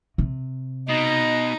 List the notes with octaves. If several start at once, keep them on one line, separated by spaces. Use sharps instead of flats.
C3
B2 D#4 D#5